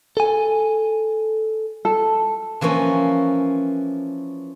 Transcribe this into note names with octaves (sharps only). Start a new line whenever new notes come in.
A4 G#5
A4
E3 F3 A#3 C#4